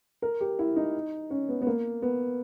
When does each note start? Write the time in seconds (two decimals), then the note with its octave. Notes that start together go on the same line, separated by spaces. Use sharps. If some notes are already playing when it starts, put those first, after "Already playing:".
0.22 A#4
0.41 G4
0.59 E4
0.76 D#4
1.30 C#4
1.49 B3
1.62 B3
1.67 A#3
2.02 B3